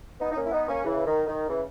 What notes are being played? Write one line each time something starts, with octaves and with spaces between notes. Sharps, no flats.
B3 D#4
D#4
A#3 C#4
E4
B3 D#4
A#3 C#4
C#3 E3
D#3
D#3
C#3 E3